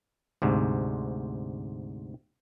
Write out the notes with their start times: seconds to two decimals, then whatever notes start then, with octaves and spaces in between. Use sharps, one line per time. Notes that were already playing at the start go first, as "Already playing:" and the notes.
0.42 D2 G#2 C3